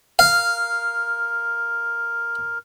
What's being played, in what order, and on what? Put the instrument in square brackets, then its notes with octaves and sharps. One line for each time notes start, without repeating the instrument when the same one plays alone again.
[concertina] A#4 [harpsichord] F5